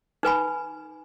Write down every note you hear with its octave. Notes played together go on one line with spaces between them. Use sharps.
D#4 B4 G#5 B5